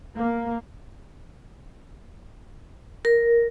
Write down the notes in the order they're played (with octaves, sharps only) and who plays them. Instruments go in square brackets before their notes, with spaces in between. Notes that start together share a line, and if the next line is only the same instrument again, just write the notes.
[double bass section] A#3
[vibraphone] A#4